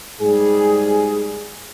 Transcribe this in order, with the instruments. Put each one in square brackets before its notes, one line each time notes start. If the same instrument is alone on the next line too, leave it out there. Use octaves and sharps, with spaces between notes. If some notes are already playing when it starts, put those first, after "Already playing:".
[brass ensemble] G#2 G3 G#4